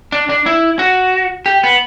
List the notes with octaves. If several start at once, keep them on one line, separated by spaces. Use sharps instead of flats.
D4
D4
E4
F#4
G4
B3